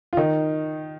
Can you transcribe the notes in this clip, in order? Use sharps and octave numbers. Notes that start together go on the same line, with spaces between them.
F4
D#3 D#4